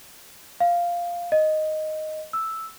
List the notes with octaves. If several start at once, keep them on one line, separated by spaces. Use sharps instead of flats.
F5
D#5
E6